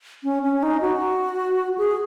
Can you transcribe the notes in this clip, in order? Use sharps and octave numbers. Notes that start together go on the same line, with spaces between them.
C#4
C#4
D#4
F#4
G#4